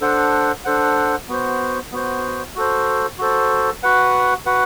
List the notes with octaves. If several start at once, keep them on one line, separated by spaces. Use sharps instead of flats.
D4 A4 C5 F#5
D4 A4 C5 F#5
B3 F#4 C5
B3 F#4 C5
F#4 A4 C5
F#4 A4 C5
F#4 B4 F#5
F#4 B4 F#5